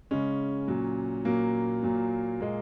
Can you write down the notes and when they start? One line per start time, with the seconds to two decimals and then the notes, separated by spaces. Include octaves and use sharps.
0.11 C#3 G#3 C#4
0.68 A#2 F#3
1.25 A#2 F#3 A#3
1.83 A#2 F#3
2.40 A#2 G#3 A#3